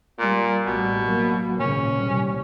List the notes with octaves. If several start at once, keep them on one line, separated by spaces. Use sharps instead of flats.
A#2 G3
A1 B2 G3
F#3 A#3
G#1 A#2 C#3 C#4
C2 G3